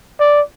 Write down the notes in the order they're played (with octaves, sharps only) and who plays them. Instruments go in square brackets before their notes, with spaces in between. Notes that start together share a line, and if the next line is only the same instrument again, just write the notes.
[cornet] D5